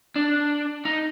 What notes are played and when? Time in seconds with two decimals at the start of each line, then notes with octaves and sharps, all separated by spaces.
0.16 D4
0.85 D#4